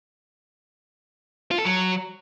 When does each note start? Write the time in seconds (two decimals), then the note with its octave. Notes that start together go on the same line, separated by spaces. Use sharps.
1.51 F4
1.58 A4
1.65 F#3